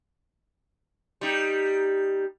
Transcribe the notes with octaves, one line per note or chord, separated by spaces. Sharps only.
G3 D#4